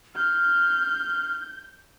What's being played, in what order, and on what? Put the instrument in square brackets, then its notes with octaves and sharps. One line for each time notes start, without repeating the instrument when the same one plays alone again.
[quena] F6 [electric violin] G6